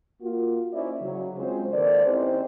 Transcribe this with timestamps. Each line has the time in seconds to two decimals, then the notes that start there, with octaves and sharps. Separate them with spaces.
0.21 A#3 F4 F#4
0.73 C#4 D#4 E4 C5 D5 E5
1.01 C#3 F#3
1.36 G#3 C4 C#4 F4 C5
1.72 D#3 A#3 A4 B4 C5 D5
2.05 C4 C#4 D#4 E4 G4 C5